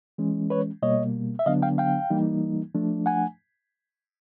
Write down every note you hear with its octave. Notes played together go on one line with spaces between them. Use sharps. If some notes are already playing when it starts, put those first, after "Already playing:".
E3 G#3 C#4
B4 C#5
B2 G3 A#3 C#5 D#5
E5
D3 F#3 B3 D4 D#5 F5
F5 G5
F5 G5
E3 G3 A#3 D#4
F3 A3 D4
F#5 G#5